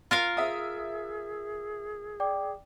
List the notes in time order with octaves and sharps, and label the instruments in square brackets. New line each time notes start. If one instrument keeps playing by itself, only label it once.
[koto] F4 A#4 F5
[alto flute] G#4 [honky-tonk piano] E5 D#6
[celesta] D5 G5 D6